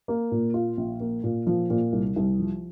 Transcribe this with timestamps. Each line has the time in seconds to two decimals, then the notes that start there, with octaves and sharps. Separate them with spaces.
0.08 A#3
0.32 A#2
0.54 F4
0.77 A#1
1.00 A#3
1.24 A#2
1.47 F3
1.70 A#2
1.93 C2
2.16 C2
2.39 F3